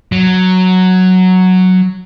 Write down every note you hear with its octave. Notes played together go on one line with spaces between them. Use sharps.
F#3